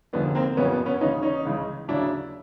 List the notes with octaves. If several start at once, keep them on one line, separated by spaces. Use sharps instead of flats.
F1 D#2 D3 F3 G#3 B3
A#3 C4
F#1 F2 C#3 F#3 B3 C#4
B3
B3 C#4
D#2 C#3 E3 C#4 D#4
C#4 D#4
C#2 C#3 E3 G#3
D#2 C#3 F#3 D4 E4